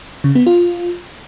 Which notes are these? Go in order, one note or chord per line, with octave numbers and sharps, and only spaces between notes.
C#3
B3
F4